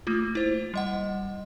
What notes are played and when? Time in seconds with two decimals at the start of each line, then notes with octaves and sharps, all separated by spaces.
0.07 A3 A#3 F4
0.35 E4 C5
0.74 G3 D#5 F#5